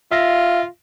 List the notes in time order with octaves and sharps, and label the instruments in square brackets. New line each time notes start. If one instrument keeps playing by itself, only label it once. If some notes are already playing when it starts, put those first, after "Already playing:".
[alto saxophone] F4 [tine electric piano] E5 F5 A#6